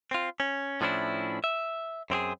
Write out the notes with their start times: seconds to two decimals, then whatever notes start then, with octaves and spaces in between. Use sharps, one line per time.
0.11 C4 F4
0.40 C#4
0.81 A2 F3 C#4 D4 E4
1.44 E5
2.10 F#2 C4 G4 G#4